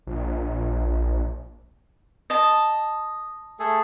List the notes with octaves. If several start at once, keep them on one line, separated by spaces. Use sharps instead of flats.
A#1
D#5 A5
A3 G#4 A4